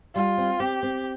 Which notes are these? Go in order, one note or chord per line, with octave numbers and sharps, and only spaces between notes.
G3 F4
C4
C4 G4
C4